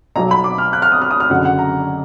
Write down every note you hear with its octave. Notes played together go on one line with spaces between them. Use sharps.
B1 B2 F#3 A#5
B5
D6
F6
F#6
F6
D#6
F6
D#6
F6
F#1 F#2 D3 F#3 F#5
F#5
A#5